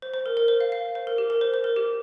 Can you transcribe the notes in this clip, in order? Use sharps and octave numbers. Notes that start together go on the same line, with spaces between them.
C5
C5
A#4
A#4
C5
F5
F5
C5
A#4
G4
A#4
C5
C5
A#4
G4